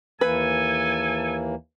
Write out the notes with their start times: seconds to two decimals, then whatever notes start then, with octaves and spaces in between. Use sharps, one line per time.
0.21 D#2 E3 A#3 A4 B4 G#5